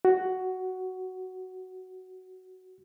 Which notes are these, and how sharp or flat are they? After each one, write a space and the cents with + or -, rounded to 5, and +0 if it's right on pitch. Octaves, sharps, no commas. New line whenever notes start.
F#4 +10